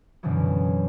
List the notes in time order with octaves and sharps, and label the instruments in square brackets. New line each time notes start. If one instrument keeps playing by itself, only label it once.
[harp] F#2 B2 D3 E3 F#3